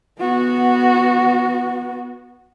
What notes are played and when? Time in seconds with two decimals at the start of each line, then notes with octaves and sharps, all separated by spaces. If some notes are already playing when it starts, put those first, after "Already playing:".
0.19 B3 F#4